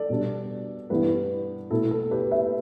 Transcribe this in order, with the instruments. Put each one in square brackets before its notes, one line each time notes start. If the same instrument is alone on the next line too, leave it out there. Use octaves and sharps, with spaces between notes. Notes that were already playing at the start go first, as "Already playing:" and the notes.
Already playing: [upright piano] A4 D5
B2 G3 D4
G2 E3 B3 E4 G4 B4
B2 A3 E4 A4
A4
G4 B4
B4 E5